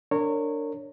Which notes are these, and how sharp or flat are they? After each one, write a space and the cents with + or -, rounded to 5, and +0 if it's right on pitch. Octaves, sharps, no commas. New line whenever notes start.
D4 +0 A#4 -30 C#5 -15